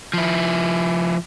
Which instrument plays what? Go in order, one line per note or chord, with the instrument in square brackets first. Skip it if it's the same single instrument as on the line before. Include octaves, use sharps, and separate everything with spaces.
[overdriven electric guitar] F3 E4